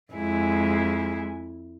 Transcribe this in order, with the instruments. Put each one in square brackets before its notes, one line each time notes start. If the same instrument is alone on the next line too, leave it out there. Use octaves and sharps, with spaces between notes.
[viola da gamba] F2 E4 [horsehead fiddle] G#3 G#5